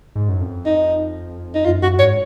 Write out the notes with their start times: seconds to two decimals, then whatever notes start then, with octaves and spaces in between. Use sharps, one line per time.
0.15 G#2
0.29 F#2
0.40 F2
0.66 D#4
1.54 D#4
1.65 F#2 F4
1.83 F#2 F#4
1.99 G#2 C#5